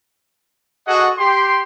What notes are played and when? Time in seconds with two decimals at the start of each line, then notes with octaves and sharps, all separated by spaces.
0.87 F#4 G#4 A4 D#5 F#5
1.18 G4 C6